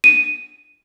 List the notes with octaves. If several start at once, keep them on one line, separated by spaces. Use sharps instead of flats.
D#7